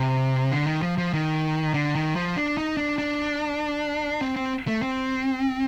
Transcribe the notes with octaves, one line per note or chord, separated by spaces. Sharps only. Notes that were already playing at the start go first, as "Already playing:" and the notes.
Already playing: C3
D3
D#3
F3
F3
D#3
D3
D#3
F3
D4
D#4
D4
D4
C4
C4
A3
C4